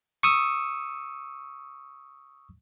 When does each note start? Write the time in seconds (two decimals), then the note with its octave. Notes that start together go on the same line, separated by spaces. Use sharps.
0.23 C#6 D#6 E6